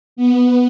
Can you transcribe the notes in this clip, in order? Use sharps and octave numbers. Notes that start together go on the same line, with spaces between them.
B3